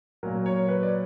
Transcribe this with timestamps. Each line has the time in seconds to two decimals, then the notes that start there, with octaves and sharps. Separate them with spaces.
0.23 A#2 F#3 A#4
0.46 C#5
0.69 B4
0.83 D5